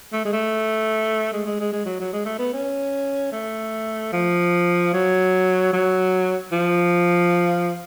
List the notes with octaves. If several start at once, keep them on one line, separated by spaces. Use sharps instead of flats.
A3
G#3
A3
G#3
G#3
G#3
G#3
F#3
F#3
G#3
A3
B3
C#4
A3
F3
F#3
F#3
F3